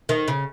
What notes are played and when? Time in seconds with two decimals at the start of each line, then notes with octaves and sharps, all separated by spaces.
0.09 D#3
0.28 C#3